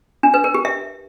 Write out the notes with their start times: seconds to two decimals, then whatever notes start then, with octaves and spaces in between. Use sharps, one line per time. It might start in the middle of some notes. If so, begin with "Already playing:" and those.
0.23 D4
0.34 B4
0.44 A#4
0.54 G4
0.65 E5